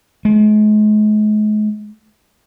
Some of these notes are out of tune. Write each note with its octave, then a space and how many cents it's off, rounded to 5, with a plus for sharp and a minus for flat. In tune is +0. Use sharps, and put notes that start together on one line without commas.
G#3 +40